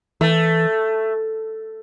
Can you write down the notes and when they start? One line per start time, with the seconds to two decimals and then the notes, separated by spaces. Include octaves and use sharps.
0.21 E3 A3